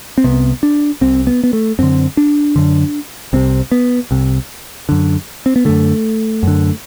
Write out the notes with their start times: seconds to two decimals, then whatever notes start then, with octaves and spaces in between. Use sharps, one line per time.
0.18 C4
0.24 C2 C3 B3
0.63 D4
1.01 C2 C3 C4
1.27 B3
1.44 B3
1.53 A3
1.79 F#2 D3 C4
2.17 D4
2.56 F#2 D3
3.33 C2 C3 C4
3.72 B3
4.11 C2 C3
4.89 F#2 D3
5.46 C4
5.56 B3
5.65 F#2 D3 A3
6.43 F#2 D3